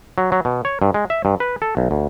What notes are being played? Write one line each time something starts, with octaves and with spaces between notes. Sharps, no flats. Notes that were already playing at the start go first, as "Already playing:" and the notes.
F#3
F#3
B2
C#5
G2
G#3
E5
G2
B4
A4
B1
D2